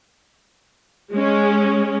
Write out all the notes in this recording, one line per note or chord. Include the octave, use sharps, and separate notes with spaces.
G#3 C#4